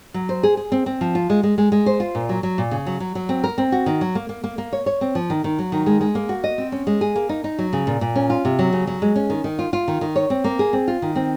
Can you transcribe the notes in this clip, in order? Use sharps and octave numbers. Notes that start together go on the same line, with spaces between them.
F#3
C5
G#4
G#4
C4
C4
F3
F4
G#3
G#3
G#3
G#3
C5
F4
A#2
F#3
F#3
A#2
C#3
F#3
F#3
F#3
C4
A#4
C4
F#4
D#3
F#3
A#3
A#3
A#3
A#3
C#5
C#5
C4
F3
D#3
D#3
F#3
D#3
G#3
G#3
A#3
F#4
D#5
C4
C#4
G#3
G#4
A#3
D#4
D#4
F#3
C#3
A#2
A#2
C#4
F4
C3
F#3
C#3
F#3
G#3
C#4
D#3
D#3
F4
F4
D#3
D#3
C#5
C4
A#3
G#4
C4
F4
D#3
C4